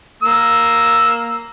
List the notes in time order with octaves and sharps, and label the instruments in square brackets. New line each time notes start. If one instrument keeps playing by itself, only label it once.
[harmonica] A#3 E6